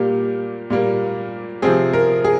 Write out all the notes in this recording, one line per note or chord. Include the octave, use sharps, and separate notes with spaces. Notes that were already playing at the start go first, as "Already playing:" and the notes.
Already playing: A#2 G3 A#3 G4
A#2 G3 A#3
C3 F3 C4 G#4
A#4
G#4